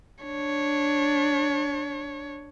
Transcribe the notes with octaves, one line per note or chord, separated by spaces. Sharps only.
D4 C#5